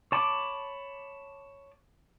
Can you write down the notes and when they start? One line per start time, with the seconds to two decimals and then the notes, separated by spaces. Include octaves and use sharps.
0.12 C#5 A5 B5 D6